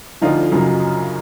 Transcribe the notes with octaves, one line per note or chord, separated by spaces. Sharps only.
D2 D3 F3 D#4 F4
F#2 C#3 F#3